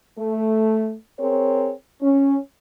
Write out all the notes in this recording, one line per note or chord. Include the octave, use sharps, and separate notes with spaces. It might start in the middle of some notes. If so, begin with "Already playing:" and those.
A3
C4 G#4 A#4 C#5
C#4